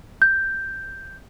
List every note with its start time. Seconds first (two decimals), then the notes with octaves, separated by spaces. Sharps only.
0.22 G6